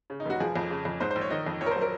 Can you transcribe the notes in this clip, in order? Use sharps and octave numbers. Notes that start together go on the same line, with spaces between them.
C#3
D#4
F1 F#4
F3 G#4
F2
C#3
F2
G#2 C5
C5
A#1
C#5
D#3 D#5
F2
A#1 C#5
A#4
F#3 C5
A#4